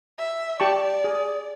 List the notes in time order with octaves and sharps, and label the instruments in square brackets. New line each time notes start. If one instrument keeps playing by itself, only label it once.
[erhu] E5
[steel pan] G4 A5 C#6 [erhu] D5
[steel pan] G#4